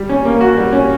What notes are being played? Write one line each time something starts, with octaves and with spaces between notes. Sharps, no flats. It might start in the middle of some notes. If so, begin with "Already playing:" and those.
Already playing: G3
C#4
A#3
F#4
G3
C#4